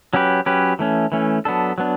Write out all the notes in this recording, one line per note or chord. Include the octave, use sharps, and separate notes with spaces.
F#3 C#4 G4 B4
F#3 C#4 G4 B4
E3 A3 C#4
E3 A3 C#4
F#3 B3 D4 A4
F#3 B3 D4